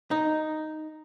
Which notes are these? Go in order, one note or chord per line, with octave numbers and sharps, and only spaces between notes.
D#4